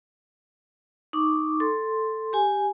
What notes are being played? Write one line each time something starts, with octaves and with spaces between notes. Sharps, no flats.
D#4 C#6 D6
A4 C6
G4 G#5